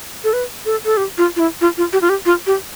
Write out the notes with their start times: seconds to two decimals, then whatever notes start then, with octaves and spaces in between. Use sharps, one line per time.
0.24 A4
0.33 B4
0.66 A4
0.85 A4
0.97 G4
1.18 F4
1.36 F4
1.40 E4
1.61 F4
1.78 F4
1.93 G4
2.02 F4
2.09 G4
2.26 F4
2.47 G4